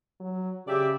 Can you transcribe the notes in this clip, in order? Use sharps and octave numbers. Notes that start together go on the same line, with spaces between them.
F#3
C#3 G4 D5 E5